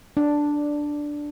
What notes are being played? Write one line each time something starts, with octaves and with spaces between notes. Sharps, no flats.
D4